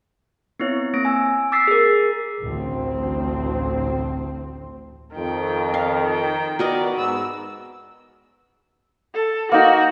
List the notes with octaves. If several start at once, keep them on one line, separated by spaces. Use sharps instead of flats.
B3 C4 E4 C#5
A#3 C4 A#6 D7
G#5 E6
D6 E6 A6 B6 C7
G#4 A#4
A1 D2 C4
F2 D#3 G5
F5
G5
B3 F#4 A#4 D5 D#5
G#2 B3 E6
A4
A#3 D#4 F#4